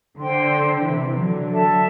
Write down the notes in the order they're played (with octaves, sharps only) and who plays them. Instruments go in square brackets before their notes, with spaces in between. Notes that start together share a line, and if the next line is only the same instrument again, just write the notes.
[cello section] D3 [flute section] C5 G5 C6
[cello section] C3 E3
D3 F#3
[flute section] A4 E5 A5